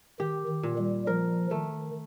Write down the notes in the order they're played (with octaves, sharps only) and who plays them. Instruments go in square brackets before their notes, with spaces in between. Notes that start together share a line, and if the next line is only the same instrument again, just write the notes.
[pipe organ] D#3 [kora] G4
[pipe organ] D#3
[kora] A#2
[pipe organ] G3
[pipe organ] F3 [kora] A#4
[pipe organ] D#3 [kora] A3